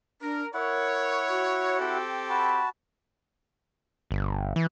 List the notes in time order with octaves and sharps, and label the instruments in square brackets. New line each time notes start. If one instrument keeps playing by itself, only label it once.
[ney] D4 [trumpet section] A#4
[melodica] E4 F#5 [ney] A#4 [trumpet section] C#5
[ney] F#4
[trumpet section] C4 G4 A4
[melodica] F#4 A5 [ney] B5
[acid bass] G1
E3